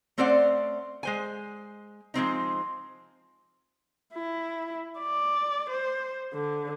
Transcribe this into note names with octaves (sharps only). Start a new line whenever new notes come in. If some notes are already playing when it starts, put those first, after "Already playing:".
A3 C4 C#4 C5 D5 F#5
G#3 C5 G#5
F3 G#3 C4 D#4
E4
D5
C5
D3